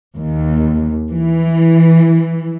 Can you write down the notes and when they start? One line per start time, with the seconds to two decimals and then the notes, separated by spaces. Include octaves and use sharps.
0.16 D#2
1.11 E3